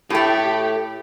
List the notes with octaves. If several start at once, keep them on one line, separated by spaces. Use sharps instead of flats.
A2 A3 G4